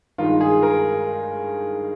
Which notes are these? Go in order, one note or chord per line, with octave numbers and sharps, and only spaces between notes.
G2 D#3 G#3 D#4 F4
G#4
A#4